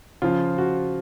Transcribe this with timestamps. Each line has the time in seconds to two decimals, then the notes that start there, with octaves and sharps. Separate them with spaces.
0.22 C#3 F3 F4
0.58 F#4